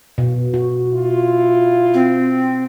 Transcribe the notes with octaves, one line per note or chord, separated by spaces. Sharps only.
B2
F#4
E4 F4
C4